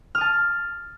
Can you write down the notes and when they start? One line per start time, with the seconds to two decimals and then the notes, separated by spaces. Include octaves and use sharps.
0.15 F6
0.18 D#6
0.21 A5